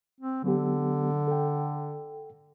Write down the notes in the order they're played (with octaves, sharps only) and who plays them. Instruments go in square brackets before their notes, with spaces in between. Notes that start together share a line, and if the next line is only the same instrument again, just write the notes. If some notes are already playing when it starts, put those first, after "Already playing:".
[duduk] C4
[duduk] D3 [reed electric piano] F#3 B3 G4
[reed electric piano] A4 G5